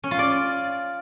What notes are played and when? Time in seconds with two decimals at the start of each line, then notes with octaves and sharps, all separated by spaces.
0.04 C#4
0.11 F4
0.19 D5